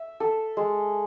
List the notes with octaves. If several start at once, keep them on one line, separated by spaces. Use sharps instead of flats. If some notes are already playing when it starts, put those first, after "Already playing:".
Already playing: E5
A4
G#3